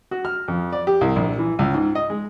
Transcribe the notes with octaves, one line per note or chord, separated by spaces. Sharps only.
F#4
F6
F2
D5
G4
C2
A#1
E3
C#2
G#2
D#5
G#3